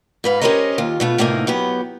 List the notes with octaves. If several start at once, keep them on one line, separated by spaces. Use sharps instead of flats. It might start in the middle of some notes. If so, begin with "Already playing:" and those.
G#2 B4 F5
C#4 G4 A#4 C5 C#5 D#5
D#2 F4
B2 A3 F4
A2 C3 A#3 C#4 D#4
F#3 B3 G4